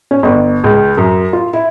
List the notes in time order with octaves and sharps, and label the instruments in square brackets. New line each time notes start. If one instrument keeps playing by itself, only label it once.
[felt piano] C#4
G1
C#2
F#2
F4
E4